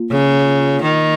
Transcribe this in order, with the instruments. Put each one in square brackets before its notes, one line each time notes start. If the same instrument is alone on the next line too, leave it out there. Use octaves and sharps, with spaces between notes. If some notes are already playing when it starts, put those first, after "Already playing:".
Already playing: [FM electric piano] A#3 F4
[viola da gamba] C#3
D#3